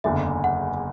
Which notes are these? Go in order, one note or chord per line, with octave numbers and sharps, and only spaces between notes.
F#1 E2 D3 E5
F#5